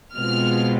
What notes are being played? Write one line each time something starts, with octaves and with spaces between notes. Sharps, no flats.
B2 G#3 C4 F4 F6